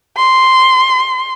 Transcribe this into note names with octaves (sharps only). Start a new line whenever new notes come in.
C6